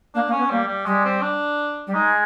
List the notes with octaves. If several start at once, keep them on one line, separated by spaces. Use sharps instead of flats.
A#3 D4
A#3
C#4
B3
G3 A#3
G3
G3 G#3
C4
D4
G3
G#3 D#4